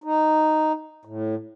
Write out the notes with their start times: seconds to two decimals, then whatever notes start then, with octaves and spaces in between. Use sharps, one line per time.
0.04 D#4
1.05 A2